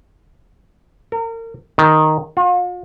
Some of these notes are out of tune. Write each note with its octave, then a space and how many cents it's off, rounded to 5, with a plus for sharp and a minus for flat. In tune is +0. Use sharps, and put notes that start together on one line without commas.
A#4 -35
D#3 +0
F4 +45